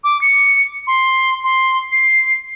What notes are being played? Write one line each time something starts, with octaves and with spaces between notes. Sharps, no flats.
D6
C#7
C6
C6
C7